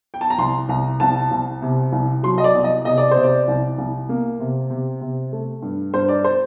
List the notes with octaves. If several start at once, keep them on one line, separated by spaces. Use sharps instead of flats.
G5
A5
A#5
C2 C6
C2 A#5
C2 A5
C2
C3
C2
F#3 C6
D#5
D5
C2
D#5
C3 D#5
D5
C3 C5
D5
C2
C2
A#3
C3
C3
C3
A3
G2
G2 C5
D5
C5